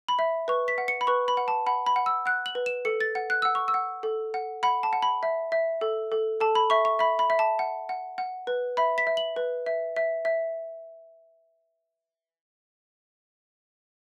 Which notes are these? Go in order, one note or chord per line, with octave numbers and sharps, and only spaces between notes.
B5
E5
B4 C#6
B6
F#5
C#7
B5
B4 C#6
B5
F#5
A5
F#5 B5
B5
F#5
E6
F#5 F#6
F#7
B4
E7
A4 C#7
A6
F#5
F#6
F#5 E6
C#6
E6
F#5
A4
F#5
F#5 B5
A5
F#5
B5
E5
E5
A4
A4
A4 A5
B5
E5 C#6
C#6
E5 B5
B5
E5
A5
F#5
F#5
F#5
B4
E5 B5
B6
E5
F#7
B4
E5
E5
E5